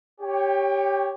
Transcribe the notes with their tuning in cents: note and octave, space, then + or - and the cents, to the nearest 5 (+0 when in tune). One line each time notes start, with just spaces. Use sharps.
G4 +0 C#5 +0 G5 +30